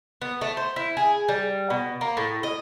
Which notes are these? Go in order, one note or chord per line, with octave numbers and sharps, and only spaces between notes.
B3
A3
C5
E4
G#4
G3
B2
A#3
A2
D#5